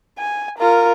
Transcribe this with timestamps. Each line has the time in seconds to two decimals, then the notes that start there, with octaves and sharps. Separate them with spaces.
0.19 G#5
0.59 F4 A#4